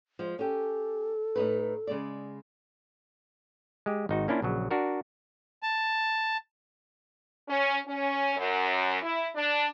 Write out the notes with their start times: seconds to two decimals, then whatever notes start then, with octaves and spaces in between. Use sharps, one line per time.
0.19 F3 G#3
0.39 C#4 G4 A4
1.36 A2 D#4 B4
1.87 C#3 G#3 D5
3.86 G#3 G4
4.09 G#1 D#4 F#4
4.28 A#3 C#4 D4 E4 F4
4.42 A#1 C#3 F#3
4.71 D4 F#4 A#4
5.63 A5
7.49 C#4
7.87 C#4
8.36 F#2
9.02 E4
9.36 D4